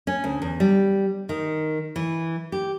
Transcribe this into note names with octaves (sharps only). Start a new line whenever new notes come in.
C#4
D2
E2
G3
D#3
E3
G4